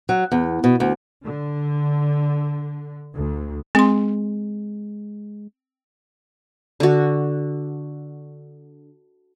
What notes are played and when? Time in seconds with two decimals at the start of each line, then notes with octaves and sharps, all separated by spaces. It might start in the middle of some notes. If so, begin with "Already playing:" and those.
0.09 F#3
0.32 E2
0.64 B2
0.80 D2
1.24 D3
3.15 D2
3.75 G#3 C4 C6
6.80 D3 F#4